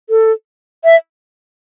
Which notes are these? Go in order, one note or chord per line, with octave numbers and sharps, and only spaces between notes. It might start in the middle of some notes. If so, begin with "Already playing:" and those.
A4
E5